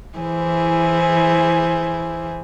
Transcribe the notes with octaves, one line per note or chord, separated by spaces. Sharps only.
E3 E4 G#4 C5